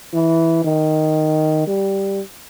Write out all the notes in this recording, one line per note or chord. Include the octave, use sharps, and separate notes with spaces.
E3
D#3
G3